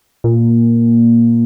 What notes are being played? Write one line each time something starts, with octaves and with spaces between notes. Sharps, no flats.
A#2